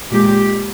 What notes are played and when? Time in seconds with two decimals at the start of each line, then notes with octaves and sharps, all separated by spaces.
0.11 A#2 G#3 G4